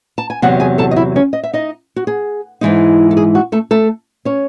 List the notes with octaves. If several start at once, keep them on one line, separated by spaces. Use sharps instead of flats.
A5
G#5
E2 C3 F#3 F#4 F#5
G#4 G#5
A4 A5
D#5
E4 E5
C#4 C#5
D#5
E5
D#4 D#5
F#4
G#4
G#2 E3 G#3 D#4
A4
G#4
F#4
A3 A4
A3 A4
C#4 C#5